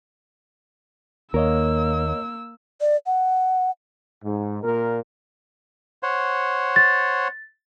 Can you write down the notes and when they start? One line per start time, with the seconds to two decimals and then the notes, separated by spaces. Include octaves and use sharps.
1.34 D#2 A#3 A#4 C#5 D#5 E6
2.81 D5
3.06 F#5
4.24 G#2
4.63 A#2 A#4
6.03 C5 C#5 F#5
6.76 A6